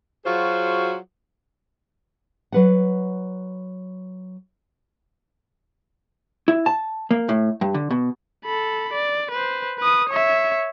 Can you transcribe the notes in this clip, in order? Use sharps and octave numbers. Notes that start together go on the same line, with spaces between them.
F#3 F4 F#4 G#4 C5
F#3 B4 F#5
E4
A5
A#3
A2
G2
D3
B2
A4 B5
D5
B4 C5
B4 D#6
C#5 E5